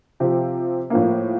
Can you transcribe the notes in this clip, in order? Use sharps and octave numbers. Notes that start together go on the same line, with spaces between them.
C3 F3 C4 G4
A2 F3 A#3